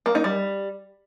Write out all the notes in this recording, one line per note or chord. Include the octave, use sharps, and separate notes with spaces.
A#3
D#4
G3